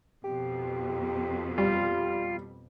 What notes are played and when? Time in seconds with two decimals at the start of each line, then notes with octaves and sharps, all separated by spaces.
0.24 F2 B2 G4
1.58 G3 F4